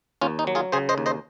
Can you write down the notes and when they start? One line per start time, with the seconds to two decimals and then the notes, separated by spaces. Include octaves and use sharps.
0.21 D#2 C#4 F4
0.39 D#4
0.47 F#3
0.55 F4 G#4
0.72 C#3 G#4 C5
0.89 C5 D#5
0.98 D#2
1.06 C5 D#5